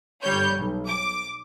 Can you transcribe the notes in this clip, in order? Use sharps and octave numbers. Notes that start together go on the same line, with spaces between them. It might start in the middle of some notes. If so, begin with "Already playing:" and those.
G1 G3 C#5 G6
B1
D6